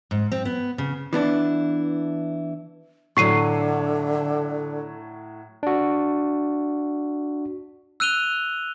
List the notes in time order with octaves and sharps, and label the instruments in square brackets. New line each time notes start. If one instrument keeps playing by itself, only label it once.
[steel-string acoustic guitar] G#2
C4
B3
C#3
[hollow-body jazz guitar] E3 B3 D4 E4
[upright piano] A2 F#3 [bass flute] D3 [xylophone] C#6 C7 D#7
[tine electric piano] D4 F#4
[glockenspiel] E6 F#6 D#7 F7 G7